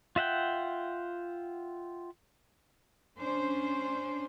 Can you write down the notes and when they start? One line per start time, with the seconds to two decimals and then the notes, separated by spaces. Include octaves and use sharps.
0.16 F4 E5 F#5 G5
3.18 C#4 D4 C5